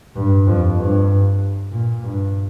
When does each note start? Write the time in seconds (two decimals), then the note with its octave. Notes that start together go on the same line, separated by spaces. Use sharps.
0.16 G2
0.47 F2
0.78 G2
1.71 A#2
2.03 G2